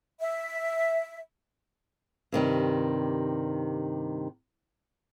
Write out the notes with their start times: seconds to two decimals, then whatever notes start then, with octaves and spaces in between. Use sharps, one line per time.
0.20 E5
2.32 G2 C3 D#3 G3